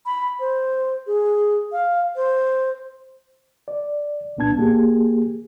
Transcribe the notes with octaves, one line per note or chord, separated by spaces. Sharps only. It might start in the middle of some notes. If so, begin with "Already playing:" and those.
B5
C5
G#4
F5
C5
D5
C2 A#2 B3 D4 A5 G#6
A#3 G4 G#4